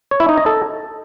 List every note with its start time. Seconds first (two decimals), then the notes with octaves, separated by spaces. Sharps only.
0.11 C#5
0.20 E4
0.29 D#4
0.37 D#5
0.46 A4